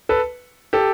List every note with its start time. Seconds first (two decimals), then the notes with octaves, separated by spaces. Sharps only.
0.09 A4 B4
0.73 G4 A4